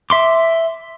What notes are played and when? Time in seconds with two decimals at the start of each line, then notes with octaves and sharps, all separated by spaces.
0.10 E5 C6 D6